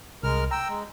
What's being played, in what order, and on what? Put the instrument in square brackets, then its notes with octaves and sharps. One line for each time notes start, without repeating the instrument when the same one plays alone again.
[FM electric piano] C2 [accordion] G#3 A#4 F6
[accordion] G5 E6 [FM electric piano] A#5
[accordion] G#3